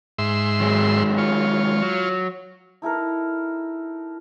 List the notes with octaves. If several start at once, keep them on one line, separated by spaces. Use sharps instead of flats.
G#2 E5 C6
D#3 F#3 G#3
F4 C#5
F#3
D#4 E4 A4 A#4